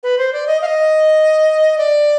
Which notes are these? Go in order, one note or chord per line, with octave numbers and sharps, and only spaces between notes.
B4
C5
D5
D#5
F5
D#5
D5